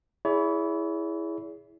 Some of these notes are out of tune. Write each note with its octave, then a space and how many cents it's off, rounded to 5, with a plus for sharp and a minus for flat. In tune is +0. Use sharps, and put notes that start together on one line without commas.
E4 +0 G#4 +0 C#5 +45